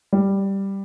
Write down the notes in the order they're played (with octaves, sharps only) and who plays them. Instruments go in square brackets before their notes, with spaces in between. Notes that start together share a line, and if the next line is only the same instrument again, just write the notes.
[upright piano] G3